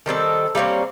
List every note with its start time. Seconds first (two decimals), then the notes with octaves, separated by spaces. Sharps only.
0.06 D#3 G3 C4 A4
0.55 G3 A#3 C4 C#5